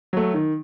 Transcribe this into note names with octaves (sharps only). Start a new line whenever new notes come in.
F#3 A3
D#3